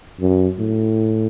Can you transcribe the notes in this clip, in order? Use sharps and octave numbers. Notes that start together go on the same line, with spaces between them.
F#2
A2